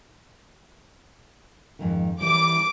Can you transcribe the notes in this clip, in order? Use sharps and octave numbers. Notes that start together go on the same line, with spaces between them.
F2 G#2 D#3
E3 G3 D6